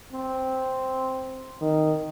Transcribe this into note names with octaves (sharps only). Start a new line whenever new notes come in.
C4
D#3